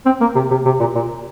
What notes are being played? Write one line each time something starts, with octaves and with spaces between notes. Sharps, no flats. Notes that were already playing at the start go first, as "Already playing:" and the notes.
C4
A#3
C3
C3
C3
A#2
A#2